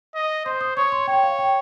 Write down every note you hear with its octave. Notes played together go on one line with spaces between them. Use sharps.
D#5
C5 C6
D#6
C#5 C#6
C6
C#5 G5
F5
G5